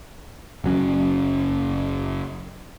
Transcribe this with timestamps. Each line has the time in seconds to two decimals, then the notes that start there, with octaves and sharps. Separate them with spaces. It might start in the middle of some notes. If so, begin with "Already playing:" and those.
0.64 F#1 F#3 C#4